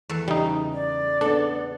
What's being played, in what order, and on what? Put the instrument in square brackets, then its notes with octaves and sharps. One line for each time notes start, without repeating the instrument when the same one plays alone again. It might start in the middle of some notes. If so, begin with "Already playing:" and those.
[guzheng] E2 A4
[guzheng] C#3 [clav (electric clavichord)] G3 D#4
[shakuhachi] D5
[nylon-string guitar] B3 A4 [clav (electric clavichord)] D4